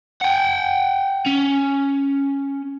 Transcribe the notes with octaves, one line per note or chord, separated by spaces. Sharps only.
F#5 G5
C#4